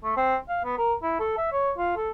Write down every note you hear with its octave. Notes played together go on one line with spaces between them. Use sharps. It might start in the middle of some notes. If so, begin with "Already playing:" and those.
A3
C4
F5
B3
A#4
E4
A4
E5
C#5
F4
A4